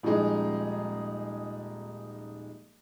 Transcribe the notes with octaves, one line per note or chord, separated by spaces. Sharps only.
D#1 F3 G#3 D#4 G#4